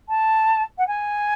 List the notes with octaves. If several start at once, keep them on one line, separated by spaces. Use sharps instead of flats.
A5
F#5
G#5